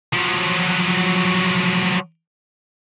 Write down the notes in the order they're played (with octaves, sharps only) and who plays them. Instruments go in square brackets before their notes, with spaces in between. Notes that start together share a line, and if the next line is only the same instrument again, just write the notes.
[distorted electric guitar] F3 F#3